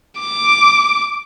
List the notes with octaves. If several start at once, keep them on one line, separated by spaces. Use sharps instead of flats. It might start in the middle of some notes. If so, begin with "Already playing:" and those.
D6